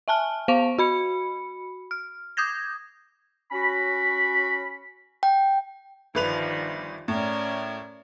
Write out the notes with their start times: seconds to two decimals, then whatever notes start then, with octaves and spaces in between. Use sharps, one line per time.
0.08 E5 G#5 A5 F6
0.48 B3 C5 F5 C#6 D7 F7
0.78 F#4 B5 C#7
1.91 F6
2.37 D6 D#6 G6 G#6 A#6
3.52 C#4 F#4 B5
5.23 G5
6.15 G1 D#3 F3 G3 B4 F7
7.08 A2 C#4 A#4 D5